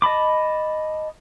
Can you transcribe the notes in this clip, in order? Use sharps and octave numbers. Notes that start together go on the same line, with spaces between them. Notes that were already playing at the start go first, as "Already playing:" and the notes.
D#5 A5 B5 D6